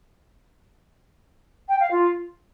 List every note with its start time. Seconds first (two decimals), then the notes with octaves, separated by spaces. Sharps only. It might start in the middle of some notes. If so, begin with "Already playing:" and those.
1.68 G5
1.79 F5
1.91 F4